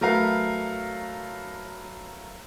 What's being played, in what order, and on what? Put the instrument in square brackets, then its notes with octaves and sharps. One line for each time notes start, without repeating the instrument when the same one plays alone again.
[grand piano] F#3 A3 A#4 B4 F5